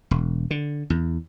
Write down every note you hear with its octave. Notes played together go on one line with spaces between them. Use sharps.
E1
D3
E2